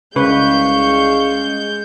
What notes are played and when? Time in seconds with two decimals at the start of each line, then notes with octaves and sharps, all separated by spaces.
0.16 C2 C#3 G#3 C#4 B4 F5 C#6 G6